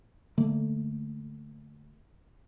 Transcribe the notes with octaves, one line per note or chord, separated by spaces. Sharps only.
D3 A3 A#3